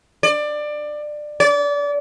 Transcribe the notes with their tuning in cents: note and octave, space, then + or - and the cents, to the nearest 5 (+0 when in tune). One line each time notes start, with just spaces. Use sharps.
D5 +20
D5 -30